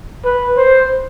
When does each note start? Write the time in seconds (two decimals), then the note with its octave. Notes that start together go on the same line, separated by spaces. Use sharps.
0.25 B4
0.57 C5